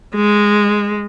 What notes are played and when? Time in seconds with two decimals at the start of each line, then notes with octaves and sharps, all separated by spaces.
0.16 G#3